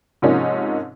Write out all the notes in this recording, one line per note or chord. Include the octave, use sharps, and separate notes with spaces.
G#2 C3 F3 A#3 C#4 D#4